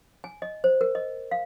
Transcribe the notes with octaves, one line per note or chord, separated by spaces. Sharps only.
G#5
D#5
C5
A#4
D#5
F5